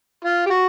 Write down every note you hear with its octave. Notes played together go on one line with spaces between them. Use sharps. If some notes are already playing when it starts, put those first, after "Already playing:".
F4
G4
F#4